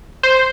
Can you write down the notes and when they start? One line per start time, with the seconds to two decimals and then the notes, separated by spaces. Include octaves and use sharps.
0.23 C5